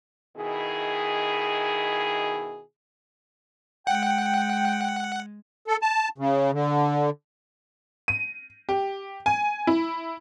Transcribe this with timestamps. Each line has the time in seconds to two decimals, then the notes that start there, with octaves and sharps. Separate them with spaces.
0.37 B2 D#3 E4 G#4
3.87 G#3 F#5 G5
5.68 A4
5.82 A5
6.18 C#3
6.53 D3
8.08 D#7
8.69 G4
9.26 G#5
9.67 E4